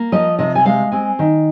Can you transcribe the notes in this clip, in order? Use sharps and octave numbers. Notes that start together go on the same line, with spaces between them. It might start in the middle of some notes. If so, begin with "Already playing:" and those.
Already playing: A#3
F3 D#5
C3 D#5
G#5
G#3 F5
C4 G#5
D#3